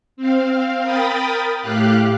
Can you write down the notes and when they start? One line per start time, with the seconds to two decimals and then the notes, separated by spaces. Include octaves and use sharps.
0.17 C4 F5
0.82 A#4 G5 B5 D#6 A6
1.62 A2 G4 F5 F#6